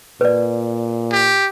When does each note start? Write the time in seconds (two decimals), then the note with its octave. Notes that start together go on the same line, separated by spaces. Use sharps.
0.21 A#2 B4 D5
1.12 G4